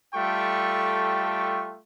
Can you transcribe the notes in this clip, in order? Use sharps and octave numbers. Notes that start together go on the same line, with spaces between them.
G3 A3 F4 A4 G5 C#6